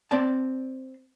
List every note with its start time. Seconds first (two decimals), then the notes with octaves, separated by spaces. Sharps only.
0.11 C4 D5 A5